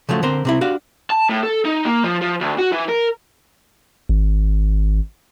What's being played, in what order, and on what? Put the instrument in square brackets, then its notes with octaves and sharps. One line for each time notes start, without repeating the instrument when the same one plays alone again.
[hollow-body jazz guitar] C#3 F3 F#3 A3
D3 C4 A#4 C5
C3 C4 E4
D4 F#4 G4 F5
[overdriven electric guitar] A5
A2
A4
D#4
A#3
F3
F3
D2
F#4
E3
A#4
[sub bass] G#1